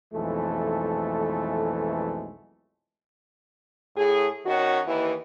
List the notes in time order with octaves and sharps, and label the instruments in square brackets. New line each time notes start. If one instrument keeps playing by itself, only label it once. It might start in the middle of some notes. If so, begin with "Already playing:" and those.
[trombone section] B1 F2 E3 G#3 A3 A4
[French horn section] A2 G#4
D#3 C#4 F#4
D#2 E3